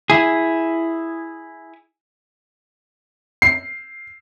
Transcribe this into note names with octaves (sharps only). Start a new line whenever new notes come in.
E4 G#4
C7